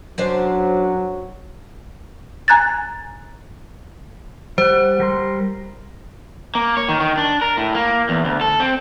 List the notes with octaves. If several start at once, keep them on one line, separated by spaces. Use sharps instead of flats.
F#2 F#3 D4 C5
G#5 A#5 F#6 G#6 A6
G3 C5 F#5
G3 A#4 C6
A#3
C#5
D#3
D#3
D4
A#4
A2
A#3
E2
D2
A4
C4